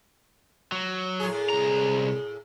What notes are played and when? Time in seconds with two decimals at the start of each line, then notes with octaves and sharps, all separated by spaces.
0.72 F#3
1.20 A2 G#4
1.50 C2 A#5